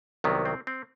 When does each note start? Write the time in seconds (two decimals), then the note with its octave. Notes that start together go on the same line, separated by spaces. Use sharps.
0.24 C2 C3 D#3 F#3 B3
0.45 C4
0.67 C4